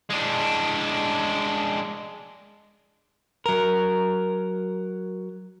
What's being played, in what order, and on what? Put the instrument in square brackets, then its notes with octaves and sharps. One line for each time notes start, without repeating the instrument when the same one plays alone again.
[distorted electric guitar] G#3 D4
[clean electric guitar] F#3 A#4